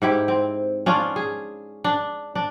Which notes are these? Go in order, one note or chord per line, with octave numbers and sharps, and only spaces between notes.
G#2 E4 G4
C4
C#4 D4 F4
G#4
D4
D4